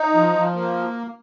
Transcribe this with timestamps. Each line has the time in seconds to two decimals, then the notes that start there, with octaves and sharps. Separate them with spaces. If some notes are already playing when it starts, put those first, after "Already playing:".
Already playing: D#4
0.14 F3
0.35 F3
0.55 A#3